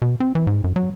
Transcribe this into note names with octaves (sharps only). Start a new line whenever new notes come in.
B2
C4
E3
G#2
F#2
F#3